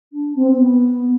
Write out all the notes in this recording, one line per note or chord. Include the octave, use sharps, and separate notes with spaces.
D4
C4
C4
B3